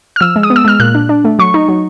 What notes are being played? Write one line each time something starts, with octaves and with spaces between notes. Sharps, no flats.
F6
F3 E6
G#3
D#6
B3
E6
G#3 F6
A#2 F#6
D4
D4
A3
F#3 C#6
D#4
F#3